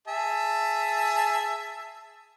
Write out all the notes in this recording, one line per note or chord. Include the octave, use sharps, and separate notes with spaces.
G#4 E5 A5